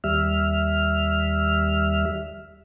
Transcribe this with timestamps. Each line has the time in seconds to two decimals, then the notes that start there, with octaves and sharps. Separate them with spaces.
0.04 D#2 G3 E5 F6